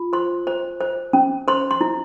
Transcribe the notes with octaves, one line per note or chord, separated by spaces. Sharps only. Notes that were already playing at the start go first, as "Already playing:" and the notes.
Already playing: F4
C5 C6
C5
C5
C#4
C5 C6
C6
E4